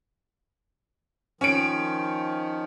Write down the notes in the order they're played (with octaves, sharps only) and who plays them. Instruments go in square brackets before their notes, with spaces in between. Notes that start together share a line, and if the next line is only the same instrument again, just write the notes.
[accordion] D#3 F3 [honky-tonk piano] C#4 D7